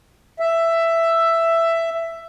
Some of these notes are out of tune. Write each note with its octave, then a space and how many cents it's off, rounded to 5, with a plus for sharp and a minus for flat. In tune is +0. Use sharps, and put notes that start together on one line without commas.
E5 +10